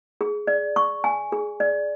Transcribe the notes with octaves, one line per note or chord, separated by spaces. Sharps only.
G#4
D5
C#6
G#5
G#4
D5